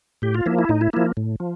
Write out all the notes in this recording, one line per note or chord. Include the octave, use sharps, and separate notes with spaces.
A2 G4
F4
F3 A#3 E4
E4
A2 D#4
E4
F3 A#3 E4
A2
F3